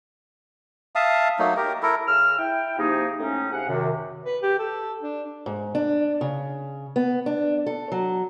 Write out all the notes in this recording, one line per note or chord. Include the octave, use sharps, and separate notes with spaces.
E5 F5 A5 D#6
F#3 A3 A#3 D#4
G4 A#4
E4 A4 A#4
C#3 E6 F6
E4 G5
C3 F3 A#3 D#4 G4 G#4
A2 C#4 D#4
C3 G#4 F5 F#5
F#2 C3 D#3
B4
G4
A4
D4
G#2
D4
C#3
B3
D4
A4
F#3